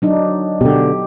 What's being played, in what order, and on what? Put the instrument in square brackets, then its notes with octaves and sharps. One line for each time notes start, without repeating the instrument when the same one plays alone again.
[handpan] F#3 D4 D#4
[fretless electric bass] B2 D3 [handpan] G4